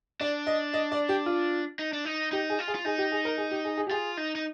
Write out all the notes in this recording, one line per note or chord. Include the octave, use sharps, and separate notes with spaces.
D4 D5
D#5
D#5
D5
G4
F4
D#4
D4
D#4
D#4 G4
G#4
F4
G#4
F4
D#4 G#4
G4
G#4
A#4
G#4
G4
G#4
G#4
G4
F4 G#4
D#4
D#4